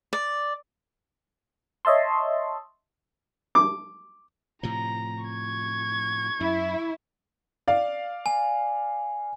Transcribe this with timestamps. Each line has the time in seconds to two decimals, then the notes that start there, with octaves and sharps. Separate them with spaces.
0.13 D5
1.85 C#5 D#5 E5 A5 C6
3.55 D6
4.63 A2 C3 F3 A#5
5.24 C#6 G#6
6.40 F#2 E4
7.68 D5 F5
8.26 G#5